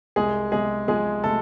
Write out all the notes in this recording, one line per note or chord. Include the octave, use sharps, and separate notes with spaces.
C2 G#3 G#4
C3 G#3 G#4
F3 G#3 G#4
C3 A3 A4